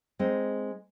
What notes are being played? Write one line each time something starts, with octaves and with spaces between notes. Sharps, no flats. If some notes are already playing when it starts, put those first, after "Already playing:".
G#3 C4 D#4